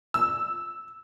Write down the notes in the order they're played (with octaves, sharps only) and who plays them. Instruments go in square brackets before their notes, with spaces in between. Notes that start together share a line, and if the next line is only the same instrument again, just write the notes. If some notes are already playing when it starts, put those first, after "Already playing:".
[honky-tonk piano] E6